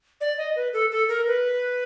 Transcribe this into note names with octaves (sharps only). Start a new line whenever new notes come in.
D5
D#5
B4
A4
A4
A#4
B4